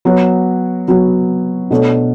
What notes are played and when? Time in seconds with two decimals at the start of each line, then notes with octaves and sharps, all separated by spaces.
0.05 F#3 B3 F#4 C#5
0.88 F#3 B3 F#4 C#5
1.71 B2 A3 D4 A4 C#5